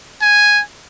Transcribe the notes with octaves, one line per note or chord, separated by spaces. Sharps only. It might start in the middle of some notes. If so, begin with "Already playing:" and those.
G#5